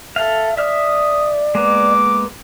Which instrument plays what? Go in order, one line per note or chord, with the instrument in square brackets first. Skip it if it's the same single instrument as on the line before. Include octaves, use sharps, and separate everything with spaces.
[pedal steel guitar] A4 F5 [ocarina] E5
[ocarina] D5 [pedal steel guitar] E5 F6 [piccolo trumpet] D#6
[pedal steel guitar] G#3 A#3 B3 [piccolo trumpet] D6